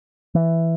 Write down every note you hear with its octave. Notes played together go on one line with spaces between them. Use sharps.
E3